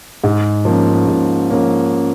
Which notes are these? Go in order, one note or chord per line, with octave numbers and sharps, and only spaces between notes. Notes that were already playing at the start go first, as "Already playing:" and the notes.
G#2
F3 A#3 C#4
G#2
F3 A#3 C#4